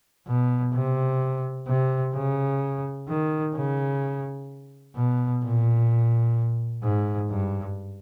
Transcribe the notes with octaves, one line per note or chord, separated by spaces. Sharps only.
B2
C3
C3
C#3
D#3
C#3
B2
A#2
G#2
G2